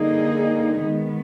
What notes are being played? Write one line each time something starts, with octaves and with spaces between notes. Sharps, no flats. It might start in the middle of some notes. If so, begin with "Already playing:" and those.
Already playing: D3 G3 A#3 D#4 G#4
D#3 G#3 B3